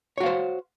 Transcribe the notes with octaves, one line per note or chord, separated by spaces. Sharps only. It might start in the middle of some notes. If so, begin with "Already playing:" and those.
F#4 C5 C#5 F5